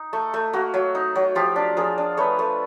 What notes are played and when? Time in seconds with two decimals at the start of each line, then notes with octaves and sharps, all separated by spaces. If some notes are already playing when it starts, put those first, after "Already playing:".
Already playing: D#4
0.13 A3
0.34 A3
0.53 A#3 F#4
0.74 F#3
0.95 D#4
1.15 F#3
1.35 F3 F4 G4
1.56 D4
1.77 F3 G#4 A#4
1.98 D4
2.17 A3 B4 C#5
2.39 A3